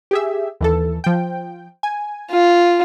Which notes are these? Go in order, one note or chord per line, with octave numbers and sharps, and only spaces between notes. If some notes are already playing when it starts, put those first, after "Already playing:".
G4 G#4 E5
D#2 E3 A4
F3 G5
G#5
F4